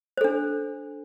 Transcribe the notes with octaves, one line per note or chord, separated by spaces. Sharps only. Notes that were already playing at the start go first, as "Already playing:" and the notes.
D4 A4 C5